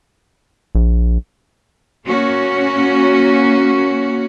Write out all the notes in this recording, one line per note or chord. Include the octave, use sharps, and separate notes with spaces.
A#1
A#3 C#4 F#4